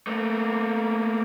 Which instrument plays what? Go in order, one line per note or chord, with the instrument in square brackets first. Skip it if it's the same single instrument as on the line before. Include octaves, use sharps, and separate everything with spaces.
[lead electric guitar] A3 A#3